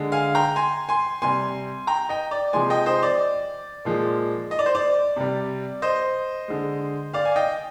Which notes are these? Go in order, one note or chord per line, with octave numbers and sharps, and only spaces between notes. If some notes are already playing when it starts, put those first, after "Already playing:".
Already playing: D3 G#3
F5 G#5
G5 A#5
G#5 C6
G#5 C6
C3 G3 G#5 C6
G5 A#5
D#5 G5
D5
C3 F3 G#3 G#5 C6
D#5 G5
C5 D#5
D5
A#2 F3 G#3
D#5
D5
C5
D5
C3 G3
C5 D#5
D3 G#3
D5 F5
G#5
D#5 G5